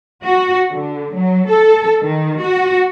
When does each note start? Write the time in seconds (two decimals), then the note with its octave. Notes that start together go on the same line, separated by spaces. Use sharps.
0.24 F#4
0.73 D3
1.14 F#3
1.51 A4
2.02 D#3
2.40 F#4